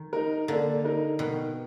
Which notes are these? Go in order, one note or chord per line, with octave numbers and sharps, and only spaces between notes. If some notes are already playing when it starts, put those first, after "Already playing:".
Already playing: D#3
D#4 A#4
D3 A#3
D#4 A#4
B2 D#3